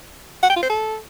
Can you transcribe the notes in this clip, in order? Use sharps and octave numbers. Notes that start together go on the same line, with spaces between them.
F#5
G5
F4
C5
A4